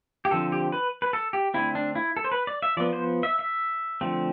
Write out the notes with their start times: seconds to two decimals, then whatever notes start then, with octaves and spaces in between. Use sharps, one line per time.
0.25 G4
0.31 D3 F3 C4 A4
0.52 G4
0.72 B4
1.02 B4
1.13 A4
1.33 G4
1.54 D3 A3 C4 E4
1.75 D4
1.95 E4
2.17 A4
2.24 C5
2.32 B4
2.47 D5
2.63 E5
2.77 F3 B3 D5
2.93 C5
3.23 E5
3.39 E5
4.01 D3 F3 A3 C4